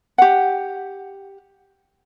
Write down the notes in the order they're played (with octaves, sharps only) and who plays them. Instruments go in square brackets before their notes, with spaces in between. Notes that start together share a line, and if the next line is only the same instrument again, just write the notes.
[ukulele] G4 F#5